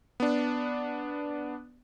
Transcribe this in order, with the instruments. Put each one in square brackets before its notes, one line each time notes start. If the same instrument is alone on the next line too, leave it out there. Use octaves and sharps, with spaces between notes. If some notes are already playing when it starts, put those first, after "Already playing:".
[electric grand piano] B3 D4